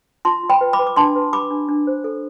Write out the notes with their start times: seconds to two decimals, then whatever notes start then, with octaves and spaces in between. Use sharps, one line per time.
0.25 F4 A5 C6
0.43 F4
0.50 G5 B5
0.61 B4
0.73 B5 D6
0.79 B4
0.87 D6
0.96 D4 A5 C6
1.15 B4
1.33 G4 B5 D6
1.51 D4
1.69 D4
1.87 C5
2.04 A4